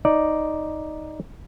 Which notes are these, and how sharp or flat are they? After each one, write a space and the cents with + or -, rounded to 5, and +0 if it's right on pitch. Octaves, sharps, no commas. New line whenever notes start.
D#4 +0 D5 +0